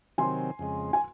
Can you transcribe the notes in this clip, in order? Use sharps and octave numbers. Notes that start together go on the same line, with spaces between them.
C3 D#3 F#3 C4 G#5 C6
F2 C#3 G#3
G#5